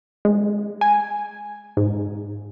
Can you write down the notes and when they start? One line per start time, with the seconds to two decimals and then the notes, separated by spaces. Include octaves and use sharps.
0.25 G#3
0.81 G#5
1.77 G#2